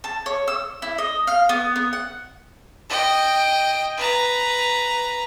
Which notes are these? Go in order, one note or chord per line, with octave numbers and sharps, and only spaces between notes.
A5
C#5
E6
E4
D#5
F5
B3
B3
F#5
D#5 G5
B4 A#5